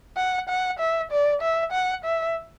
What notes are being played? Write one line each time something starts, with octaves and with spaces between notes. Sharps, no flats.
F#5
F#5
E5
D5
E5
F#5
E5